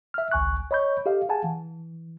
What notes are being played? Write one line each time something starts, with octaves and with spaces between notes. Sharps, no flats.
E5 F6
G#1 C#2 G#5 C#6 F#6
C#5 D#5 B5 C#6 G6
G4 A4 D#5 F5
G#4 F5 F#5 G#5 A5
E3